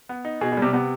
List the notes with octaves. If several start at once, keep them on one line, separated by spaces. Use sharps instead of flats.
B3
D#4
B2 G#4
B2
C3 G3
C3 B3